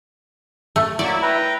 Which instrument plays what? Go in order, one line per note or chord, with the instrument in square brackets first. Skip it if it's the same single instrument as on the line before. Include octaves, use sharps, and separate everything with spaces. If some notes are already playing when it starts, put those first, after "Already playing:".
[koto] A3
[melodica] F#3 A#3 C#6 [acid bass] E4 [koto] D5
[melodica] B4 G5 A#5